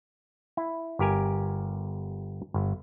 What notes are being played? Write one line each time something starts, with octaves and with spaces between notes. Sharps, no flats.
E4
G1 G4 A#4 G#5
G1